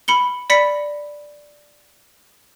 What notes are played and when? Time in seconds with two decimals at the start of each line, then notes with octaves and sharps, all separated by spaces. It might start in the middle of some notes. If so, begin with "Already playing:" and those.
0.08 B5 C#7 G7
0.50 D5 B5 A#6 B6 C#7